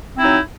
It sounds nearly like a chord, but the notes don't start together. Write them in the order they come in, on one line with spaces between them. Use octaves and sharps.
C4 E4 D#4 F#3